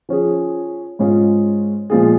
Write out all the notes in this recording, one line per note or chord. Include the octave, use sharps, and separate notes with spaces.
F3 C#4 G#4
G#2 G#3 C#4 F4 G#4
A#2 F3 G#3 F4 G#4